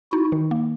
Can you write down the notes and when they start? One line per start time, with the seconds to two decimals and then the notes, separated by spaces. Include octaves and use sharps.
0.12 D#4 E4 F#4
0.32 D#3
0.51 A#3